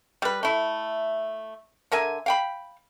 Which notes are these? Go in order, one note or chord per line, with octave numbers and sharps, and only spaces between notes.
G3 B4
A3 E4
D3 A#4 E5 G#5
F5 G5 B5